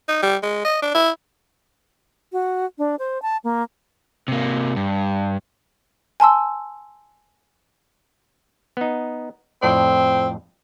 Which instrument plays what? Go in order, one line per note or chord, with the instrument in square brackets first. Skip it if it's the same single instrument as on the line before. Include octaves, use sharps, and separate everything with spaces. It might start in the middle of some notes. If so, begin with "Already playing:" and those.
[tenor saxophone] D#4
G3
G#3
D#5
D4
E4
[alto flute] F#4
D4
C5
A5
A#3
[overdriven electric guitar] C3 A#3
G2
[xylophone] G#5 A5 C6 E6
[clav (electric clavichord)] B3 D#4
[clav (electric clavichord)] F2 A2 D5 [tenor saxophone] C4